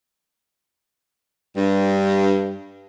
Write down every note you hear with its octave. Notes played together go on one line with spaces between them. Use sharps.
G2